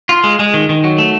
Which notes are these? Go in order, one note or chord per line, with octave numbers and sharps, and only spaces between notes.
F4
G#3
G#3
D#3
D#3
F#3
A3